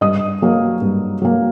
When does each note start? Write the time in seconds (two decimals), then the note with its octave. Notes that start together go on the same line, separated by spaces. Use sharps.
0.01 G2 D#5 D#6
0.42 F#3 A#3
0.81 G2
1.22 F#3 A#3